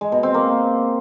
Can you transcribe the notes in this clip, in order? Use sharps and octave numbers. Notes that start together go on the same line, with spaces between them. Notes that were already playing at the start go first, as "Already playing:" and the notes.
G#3
B2
C4
A#3